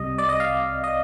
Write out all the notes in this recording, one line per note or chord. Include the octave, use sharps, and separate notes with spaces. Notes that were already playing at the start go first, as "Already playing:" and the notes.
Already playing: C2 C3 G3 D#5
D5
D#5
F5
D#5